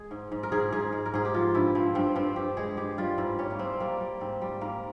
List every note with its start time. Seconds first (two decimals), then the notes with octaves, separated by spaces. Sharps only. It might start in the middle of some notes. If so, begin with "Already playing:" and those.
Already playing: G#3 G#4
0.11 G#2
0.32 G#2
0.43 A#4
0.52 G#2 G#4
0.72 G#2 G#4
0.92 G#3
1.06 A#4
1.14 G#2 G#4
1.25 G4
1.34 F3 F4
1.55 G2 E4
1.75 F3 C4
1.95 G2 C4
2.16 G2 C4
2.36 G2 G4
2.57 G#3 G#4
2.77 G2 G4
2.98 G3 F4
3.18 G#2 E4
3.39 G3 C#4
3.51 A#3
3.59 G3 C4
3.80 G3 A#3
4.00 G3
4.21 G#2 C4
4.42 G3
4.61 G#2 A#3